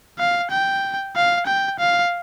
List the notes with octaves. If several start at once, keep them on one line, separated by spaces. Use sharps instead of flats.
F5
G5
F5
G5
F5